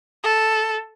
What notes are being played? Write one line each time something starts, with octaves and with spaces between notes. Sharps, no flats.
A4